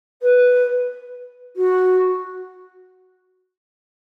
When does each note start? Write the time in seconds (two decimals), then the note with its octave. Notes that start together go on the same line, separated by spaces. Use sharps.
0.22 B4
1.56 F#4